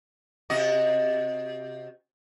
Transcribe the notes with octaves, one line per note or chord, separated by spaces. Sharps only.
C3 F#4 D#5